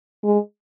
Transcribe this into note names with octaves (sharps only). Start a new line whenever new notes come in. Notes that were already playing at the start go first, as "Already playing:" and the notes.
G#3